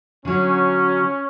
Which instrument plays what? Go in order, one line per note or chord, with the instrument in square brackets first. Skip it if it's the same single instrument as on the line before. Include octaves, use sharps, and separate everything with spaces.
[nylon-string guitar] D3 F#3 [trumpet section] C#4